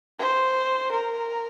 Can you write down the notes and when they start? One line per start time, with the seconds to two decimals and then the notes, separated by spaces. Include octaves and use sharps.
0.19 C5
0.91 A#4